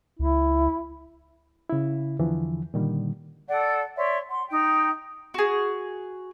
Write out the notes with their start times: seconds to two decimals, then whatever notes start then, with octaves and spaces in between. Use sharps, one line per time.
0.19 C#2 E4
1.69 C#3 E4
2.19 E2 D3 E3 F3
2.74 A#2 D3 D#3 G3
3.48 A4 D5 F#5
3.96 C#5 D5 E5 C6
4.29 F#5 C6
4.48 D#4 G5
5.34 F#4 G#4